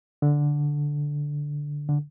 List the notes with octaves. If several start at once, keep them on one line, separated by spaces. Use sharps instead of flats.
D3
D3